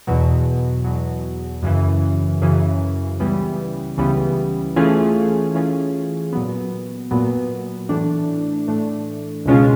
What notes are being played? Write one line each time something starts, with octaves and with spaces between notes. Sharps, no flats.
E2 B2 F#3
E2 B2 F#3
F#2 C#3 E3
F#2 C#3 E3
C#2 C#3 E3 G3 B3
C#2 C#3 E3 G3 B3
E3 A3 C#4 F4 G#4
E3 A3 C#4 F4 G#4
A#2 F#3 B3
A#2 F#3 B3
A2 E3 A3 D4
A2 E3 A3 D4
C#2 B2 G#3 C#4 F4